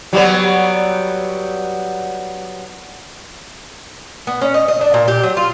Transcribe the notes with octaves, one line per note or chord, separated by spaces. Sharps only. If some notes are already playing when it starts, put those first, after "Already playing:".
F#3 G3 B3
B3
C#4
D#5
D#5
D4
A#2
G4
F#3
F4